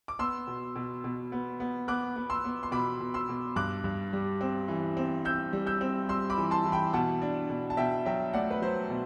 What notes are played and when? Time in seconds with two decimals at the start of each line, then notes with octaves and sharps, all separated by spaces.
0.08 D6
0.19 B3 C6 E6
0.47 B2
0.76 B2
1.04 B2
1.32 B3
1.60 B3
1.88 B3 D6 F#6
2.16 B3
2.30 C6 E6
2.45 B3
2.63 C6
2.72 B2 B5 D6
3.00 B2
3.14 C6 E6
3.29 B2
3.56 G2 D6 F#6
3.84 G2
4.13 G3
4.41 C4
4.68 E3
4.97 C4
5.25 C4 E6 G6
5.53 G3
5.66 E6 G6
5.81 C4
6.09 G3 C6 E6
6.30 B5 D6
6.37 E3
6.51 A5 C6
6.65 E3
6.72 G5 B5
6.93 B2 F#5 A5
7.22 D4
7.50 B2
7.70 A5
7.77 B2 E5 G5
8.06 F#3 E5 G5
8.33 A3 D5 F#5
8.51 B4
8.62 F#3 C5
8.90 B2